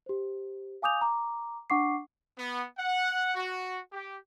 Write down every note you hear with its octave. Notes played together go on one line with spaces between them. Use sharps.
G4 C5
F5 G#5 D6 D#6 G6 F7
A#5 D6
D4 F#5 C#6 D6 C7
B3
F#5
F#4
G4